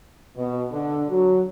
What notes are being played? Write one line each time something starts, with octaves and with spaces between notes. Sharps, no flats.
B2
D3
F#3